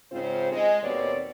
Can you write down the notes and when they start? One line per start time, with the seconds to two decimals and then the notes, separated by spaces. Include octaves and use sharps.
0.11 G#2 C#3 C4 F4 C5
0.52 G#3
0.83 D#2 B2 C4 C#5 D5